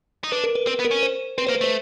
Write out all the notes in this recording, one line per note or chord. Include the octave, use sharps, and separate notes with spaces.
D#4
D4 B4
A#4
B4
C4 B4
B3
A#4
C#4
C5
C4 B4
A#3 C5
B4
A3 C5